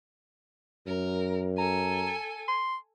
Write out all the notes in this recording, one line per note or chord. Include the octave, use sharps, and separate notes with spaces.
F#2 A#4
A4 G#5 A#5
C6